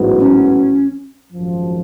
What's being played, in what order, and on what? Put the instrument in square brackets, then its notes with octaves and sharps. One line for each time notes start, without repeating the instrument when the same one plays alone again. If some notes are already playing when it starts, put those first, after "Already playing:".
Already playing: [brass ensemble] A1 G#2 F#3 B3 F#4
[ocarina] C#4
[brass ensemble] G#1 F#2 F3